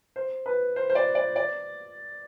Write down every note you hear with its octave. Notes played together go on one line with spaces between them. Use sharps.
C5
B4
C5
C5
D5
D5
D5